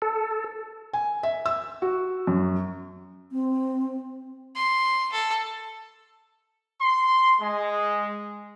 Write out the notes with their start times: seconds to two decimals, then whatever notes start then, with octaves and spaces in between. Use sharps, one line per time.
0.02 A4
0.93 G#5
1.23 E5
1.46 E6
1.82 F#4
2.27 F#2
3.32 C4
4.55 C6
5.12 A4
6.82 C6
7.41 G#3